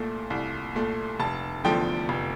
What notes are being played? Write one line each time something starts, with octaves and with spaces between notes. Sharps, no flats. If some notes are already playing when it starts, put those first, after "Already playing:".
Already playing: C2 A#2 A3
C2
A#2 A3
F1 A5
E2 D3 F3 A3 G5
F1